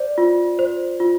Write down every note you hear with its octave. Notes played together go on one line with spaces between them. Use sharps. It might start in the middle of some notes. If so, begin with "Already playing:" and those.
Already playing: C5 D5
F4
C5
F4